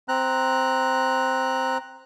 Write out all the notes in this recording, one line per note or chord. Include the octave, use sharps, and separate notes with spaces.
C4 A#5 F#6